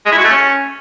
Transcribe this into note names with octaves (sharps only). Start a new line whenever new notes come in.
G#3
E4
F#4
A3
C#4